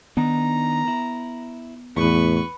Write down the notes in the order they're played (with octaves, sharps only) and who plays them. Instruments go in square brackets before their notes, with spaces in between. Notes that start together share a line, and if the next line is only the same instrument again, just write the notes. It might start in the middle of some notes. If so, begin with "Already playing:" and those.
[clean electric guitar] D#3 D4 D#4 [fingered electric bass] B3 [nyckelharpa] A#5
[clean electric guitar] E4
[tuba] E2 [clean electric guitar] A2 B3 [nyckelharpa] B4 C#6